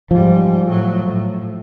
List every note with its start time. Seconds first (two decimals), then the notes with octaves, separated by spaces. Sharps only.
0.11 G#2 F3 G3
0.67 A2 F#3
1.07 A2